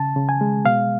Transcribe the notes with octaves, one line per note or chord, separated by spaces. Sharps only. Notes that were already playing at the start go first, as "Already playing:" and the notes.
Already playing: C#3 A5
C#3
G#5
G#3
B2 F5